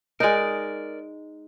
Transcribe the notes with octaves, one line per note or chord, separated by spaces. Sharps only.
G#3 D#4 A#4 D5